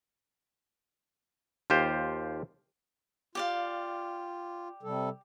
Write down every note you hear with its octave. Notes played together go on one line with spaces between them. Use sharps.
D#2 F4 G4 C5
F4 G4 D5 F5
C3 G3 A4